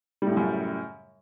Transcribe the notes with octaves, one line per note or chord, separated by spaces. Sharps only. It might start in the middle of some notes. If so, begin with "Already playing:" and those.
F#2 A2 C#3 G3